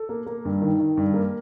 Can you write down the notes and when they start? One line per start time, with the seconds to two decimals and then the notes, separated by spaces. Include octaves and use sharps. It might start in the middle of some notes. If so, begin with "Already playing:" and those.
Already playing: A4
0.09 A#3
0.26 A#3
0.45 G2
0.62 D#3
0.79 D#3
0.97 G2
1.14 A#3